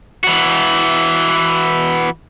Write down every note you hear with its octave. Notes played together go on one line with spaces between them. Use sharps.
E3 F#4